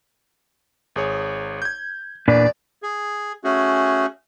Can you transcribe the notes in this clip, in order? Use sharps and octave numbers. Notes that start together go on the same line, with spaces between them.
G#1 G#4 C#5
G6 G#6
E2 A#2 D4 B4 D5
G#4
A3 C#4 F#4 G#4